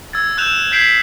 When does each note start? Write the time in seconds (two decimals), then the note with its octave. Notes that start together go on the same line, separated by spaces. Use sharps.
0.13 E6 G#6 A6
0.37 E6 F#6 G6 E7 F7
0.71 G6 G#6 B6 C7 D7 F#7